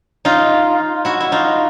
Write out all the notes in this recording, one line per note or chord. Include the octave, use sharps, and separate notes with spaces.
D#4 F4
E4 F#4
E4
D#4 F4